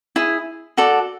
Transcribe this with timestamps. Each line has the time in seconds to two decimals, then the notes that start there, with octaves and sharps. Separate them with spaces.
0.16 E4 G#4
0.77 F#4 A4 D5